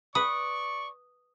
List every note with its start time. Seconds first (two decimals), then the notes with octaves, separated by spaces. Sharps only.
0.15 B4 D5 C#6 D#6